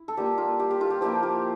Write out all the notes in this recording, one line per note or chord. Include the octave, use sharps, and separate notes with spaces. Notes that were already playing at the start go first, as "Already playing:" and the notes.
Already playing: E4
A4
G3 A#3 F4 G4
F4
G4
G4
F4 A4
G4
F3 A#3 E4 G4
F4